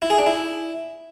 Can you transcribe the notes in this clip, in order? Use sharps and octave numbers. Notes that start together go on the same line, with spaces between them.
E4
G#4
D4
E4